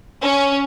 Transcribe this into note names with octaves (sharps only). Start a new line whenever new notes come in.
C#4